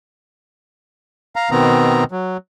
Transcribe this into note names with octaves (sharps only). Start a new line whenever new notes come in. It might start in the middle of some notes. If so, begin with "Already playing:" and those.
F5 A#5
B2 D#3 B3 C4 A#5
F#3